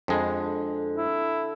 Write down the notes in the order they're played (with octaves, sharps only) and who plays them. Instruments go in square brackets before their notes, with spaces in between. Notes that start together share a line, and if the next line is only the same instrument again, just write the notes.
[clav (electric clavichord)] F2 G#3 [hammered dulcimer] D3
[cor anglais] E4